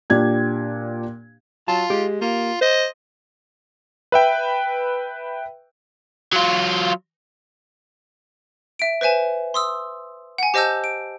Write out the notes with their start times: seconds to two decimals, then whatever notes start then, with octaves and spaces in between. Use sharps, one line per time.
0.10 A#2 D4 G4 G#6
1.68 F#3 F4 A5
1.90 G#3 G4
2.21 A#3 F4
2.61 C5 D#5
4.12 B4 E5 G5
6.33 F#3 F4
8.79 E5 D7
9.01 B4 C5 E5 G#5 E7
9.54 C6 D#6 E6
10.38 F#5 G#5
10.54 G4 C5 D#5 A5 E6 G6
10.84 D7